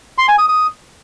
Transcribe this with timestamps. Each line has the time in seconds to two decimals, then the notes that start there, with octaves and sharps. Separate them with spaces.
0.18 C6
0.28 G#5
0.38 D#6
0.49 D#6